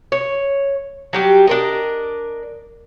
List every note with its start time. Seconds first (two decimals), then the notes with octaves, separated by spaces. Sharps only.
0.12 C#5
1.13 F#3 G3 G4
1.47 D4 A#4 D#5